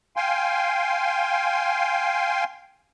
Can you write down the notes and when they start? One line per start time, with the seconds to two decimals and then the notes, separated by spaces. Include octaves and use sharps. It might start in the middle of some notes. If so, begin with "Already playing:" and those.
0.16 F5 G5 G#5 C6